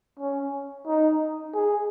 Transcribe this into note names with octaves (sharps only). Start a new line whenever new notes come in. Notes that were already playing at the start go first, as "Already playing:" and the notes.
C#4
D#4
G#4